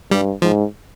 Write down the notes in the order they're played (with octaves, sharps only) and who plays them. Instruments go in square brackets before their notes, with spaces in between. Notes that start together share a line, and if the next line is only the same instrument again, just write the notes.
[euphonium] G2 [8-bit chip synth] G3
[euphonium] G#2 [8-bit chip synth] F3